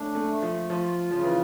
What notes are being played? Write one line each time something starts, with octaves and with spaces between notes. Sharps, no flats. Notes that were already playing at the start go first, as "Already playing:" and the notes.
Already playing: A3 C#4 D4
A3
A3
F3
F3 F4
C#3 F3
E3